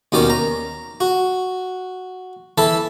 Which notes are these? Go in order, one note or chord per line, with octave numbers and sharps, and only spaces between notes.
D#2 B2 D#3 C#4 D5
A#5
F#4
E3 A4 A5 B5